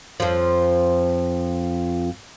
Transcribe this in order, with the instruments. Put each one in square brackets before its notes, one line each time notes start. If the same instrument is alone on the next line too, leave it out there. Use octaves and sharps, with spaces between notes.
[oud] F2 F3